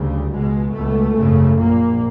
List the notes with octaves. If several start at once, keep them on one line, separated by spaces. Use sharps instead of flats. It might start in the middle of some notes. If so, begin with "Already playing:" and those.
Already playing: D2 C#3 G3
C#2 B2 G#3
C#2 B2 A3
G#1 F#2 C#3
A#1 A#2 A#3